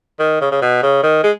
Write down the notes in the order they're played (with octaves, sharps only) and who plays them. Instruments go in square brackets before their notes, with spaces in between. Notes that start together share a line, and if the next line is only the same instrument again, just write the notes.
[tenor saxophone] D#3
C#3
C#3
B2
C#3
D#3
G#3